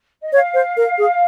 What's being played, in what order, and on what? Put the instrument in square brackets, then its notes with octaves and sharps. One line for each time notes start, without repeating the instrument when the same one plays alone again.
[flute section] D#5
[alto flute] C#5 [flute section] F5
[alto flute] C5
A#4
G#4